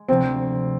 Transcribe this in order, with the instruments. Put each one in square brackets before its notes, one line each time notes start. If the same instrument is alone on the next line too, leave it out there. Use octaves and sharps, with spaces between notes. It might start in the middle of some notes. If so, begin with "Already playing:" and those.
Already playing: [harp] G#3
[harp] D2 C3 F3 [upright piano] C4